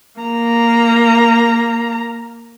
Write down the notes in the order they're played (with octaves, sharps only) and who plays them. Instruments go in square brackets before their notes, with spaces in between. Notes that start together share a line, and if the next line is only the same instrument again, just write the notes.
[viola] A#3 A#5